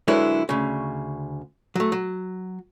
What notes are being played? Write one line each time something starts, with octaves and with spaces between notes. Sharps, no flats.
D3 F#3 G#3 E4 A#4 B4
D2 C#3
F#3 A3
F#3